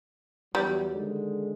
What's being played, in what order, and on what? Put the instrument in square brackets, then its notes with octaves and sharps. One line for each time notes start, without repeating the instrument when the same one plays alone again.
[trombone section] E2 F#3 [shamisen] G3
[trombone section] D3 D#3 G#3